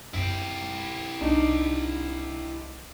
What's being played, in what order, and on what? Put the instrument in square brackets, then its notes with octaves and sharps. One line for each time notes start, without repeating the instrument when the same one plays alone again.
[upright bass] F#2 C4 [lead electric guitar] E4 G4
[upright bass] C2 [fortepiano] D4 D#4